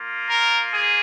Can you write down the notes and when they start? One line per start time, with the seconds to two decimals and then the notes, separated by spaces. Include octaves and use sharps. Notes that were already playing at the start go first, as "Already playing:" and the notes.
Already playing: A#3 F4
0.28 A#4
0.73 G#4